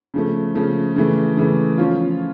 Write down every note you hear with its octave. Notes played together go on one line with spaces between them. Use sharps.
C#3 F3 A3
C#3 F3 A3
C#3 E3 A3
C#3 E3 A3
F3 C#4 F4